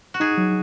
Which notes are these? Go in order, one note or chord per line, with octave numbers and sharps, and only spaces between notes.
F#4
D#4 G#4
F#3